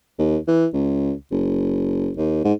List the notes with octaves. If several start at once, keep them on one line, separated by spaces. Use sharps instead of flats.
D#2
E3
C#2
F#1
D#2
G#2